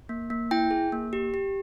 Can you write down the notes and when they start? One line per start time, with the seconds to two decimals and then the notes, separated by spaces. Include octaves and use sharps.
0.09 A#3
0.30 A#3
0.51 E4 G5
0.71 G#4
0.92 A#3
1.13 G4
1.34 G4